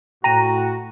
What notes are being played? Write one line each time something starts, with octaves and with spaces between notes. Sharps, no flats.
A2 F#4 G5 A#5 D#7